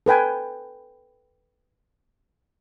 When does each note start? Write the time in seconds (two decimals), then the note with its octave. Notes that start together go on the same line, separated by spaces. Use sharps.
0.06 A4 B4 G5 G#5